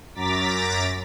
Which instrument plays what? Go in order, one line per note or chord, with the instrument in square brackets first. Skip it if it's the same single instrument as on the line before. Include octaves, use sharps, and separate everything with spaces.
[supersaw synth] F#2 A#5 D6 A6 B6